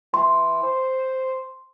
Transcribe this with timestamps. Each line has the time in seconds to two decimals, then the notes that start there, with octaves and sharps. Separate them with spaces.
0.14 E3 C6
0.63 C5